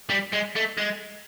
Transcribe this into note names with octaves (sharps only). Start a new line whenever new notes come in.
G3
G#3
A3
G#3